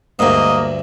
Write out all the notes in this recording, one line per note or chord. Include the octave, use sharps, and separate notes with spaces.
D2 G2 G#3 A#3 D#5